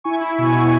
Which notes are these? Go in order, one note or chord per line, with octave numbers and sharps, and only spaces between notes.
E4 G#5 C#6
E4
B2 G#5 C#6
B2